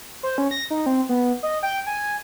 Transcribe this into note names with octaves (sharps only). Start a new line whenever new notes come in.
C5
C#4
A#6
D#4
C4
B3
D#5
G5
G#5